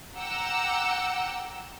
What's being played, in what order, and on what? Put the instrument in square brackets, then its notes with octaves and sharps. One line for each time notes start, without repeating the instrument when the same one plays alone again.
[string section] F#5 G5 A#5 D6 E6